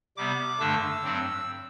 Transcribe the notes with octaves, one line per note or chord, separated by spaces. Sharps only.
C3 G3 B3 D6
G2 D3 A3 D4 E6
G2 F#3 C4